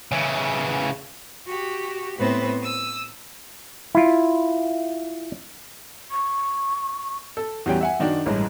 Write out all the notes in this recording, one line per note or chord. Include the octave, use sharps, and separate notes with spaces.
C#3 E3
F#4 G4
A2 B3 C4 B4 C5
D#6 E6
E4 F4
C#6
A4
E2 F#3 G3 C#4 G5
E5 F#5 G#5
F#2 D#3 D4 F#4 G5
A1 G2 E3 G#3